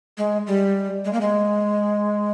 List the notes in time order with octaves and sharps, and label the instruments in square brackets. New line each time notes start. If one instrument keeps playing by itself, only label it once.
[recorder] G#3
G3
G#3
A#3
G#3